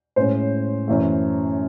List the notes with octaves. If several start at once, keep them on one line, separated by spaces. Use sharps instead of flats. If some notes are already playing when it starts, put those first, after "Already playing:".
A2 G#3 C#4 C5
F#2 E3 A3